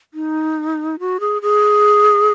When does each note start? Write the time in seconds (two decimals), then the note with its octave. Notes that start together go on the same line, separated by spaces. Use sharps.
0.14 D#4
0.99 F#4
1.20 G#4
1.42 G#4